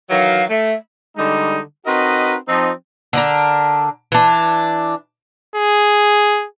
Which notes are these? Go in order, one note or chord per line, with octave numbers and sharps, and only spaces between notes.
D#3 E3 F#3 F5
A3 E5
D3 G3 G#3 D#4
C4 D#4 F#4 A#4 B4 D#5
F3 C4 D#4
D3 D4 A#4
E3 D4
G#4